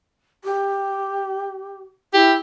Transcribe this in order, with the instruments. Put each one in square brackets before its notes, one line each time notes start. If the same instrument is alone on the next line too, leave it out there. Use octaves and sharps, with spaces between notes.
[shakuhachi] G4
[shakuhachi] E4 [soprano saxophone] G4